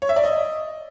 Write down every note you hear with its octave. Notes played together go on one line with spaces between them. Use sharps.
C#5
E5
D5
D#5